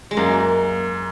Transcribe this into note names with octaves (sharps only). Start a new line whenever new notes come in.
G#3
F#2 A#3